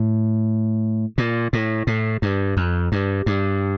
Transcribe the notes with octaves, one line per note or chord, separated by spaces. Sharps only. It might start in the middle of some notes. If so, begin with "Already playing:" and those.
Already playing: A2
A#2
A2
A2
G2
F2
G2
G2